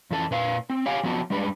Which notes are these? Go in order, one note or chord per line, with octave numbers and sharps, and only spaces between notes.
F2 E3 A4 A5
A#2 B4 F5
C4
G4 C#5 F5 F#5 G#5
F3 F#3 B3 F#4 A5
G3 G#3 D4 B4